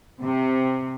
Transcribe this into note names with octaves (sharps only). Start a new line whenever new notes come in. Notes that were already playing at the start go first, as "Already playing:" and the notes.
C3